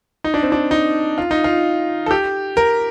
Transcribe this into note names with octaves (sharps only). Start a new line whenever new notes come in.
D#4
D4
C4
D4
D#4
F4
D#4
F4
A4
G4
A#4